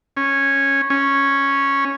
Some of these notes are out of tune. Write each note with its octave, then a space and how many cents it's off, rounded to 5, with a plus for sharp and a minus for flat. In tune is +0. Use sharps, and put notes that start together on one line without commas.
C#4 -10
C#4 -5